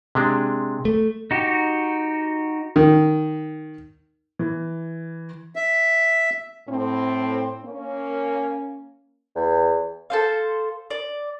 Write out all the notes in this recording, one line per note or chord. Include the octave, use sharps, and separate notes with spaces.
C3 G#3 D4
A3
D#4 F#4 G4
D#3
E3
E5
A2 C4
A#3 C#4
E2
A4 C5 F5
D5